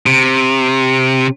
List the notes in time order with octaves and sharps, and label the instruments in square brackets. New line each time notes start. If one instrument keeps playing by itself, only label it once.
[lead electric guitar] C3